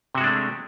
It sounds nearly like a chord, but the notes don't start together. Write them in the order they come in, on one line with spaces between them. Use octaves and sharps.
C3 F#4 G#3 D4 A3